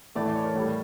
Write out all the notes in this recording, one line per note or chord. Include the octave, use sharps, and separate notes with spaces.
A2 E3 A3 D5
D5
C#5
A#4
A2 G3 A4